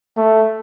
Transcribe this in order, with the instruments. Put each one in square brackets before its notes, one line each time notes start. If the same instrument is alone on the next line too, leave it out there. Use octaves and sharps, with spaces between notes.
[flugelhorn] A3